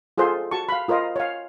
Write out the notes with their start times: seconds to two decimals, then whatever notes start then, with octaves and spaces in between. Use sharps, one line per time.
0.18 F4 G#4 A4 C5 C6
0.51 F#4 A5 C#6
0.69 F5 B5
0.88 F4 A#4 C5 D#5 F5
1.16 C#5 F5